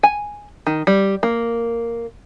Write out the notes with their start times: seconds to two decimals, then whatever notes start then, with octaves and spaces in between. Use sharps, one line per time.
0.03 G#5
0.67 D#3
0.87 G3
1.23 A#3